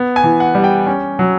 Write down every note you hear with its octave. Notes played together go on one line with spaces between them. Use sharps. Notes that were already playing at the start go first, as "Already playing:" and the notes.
Already playing: B3
G#5
E3
F#5
G3
G5
C#4
F#3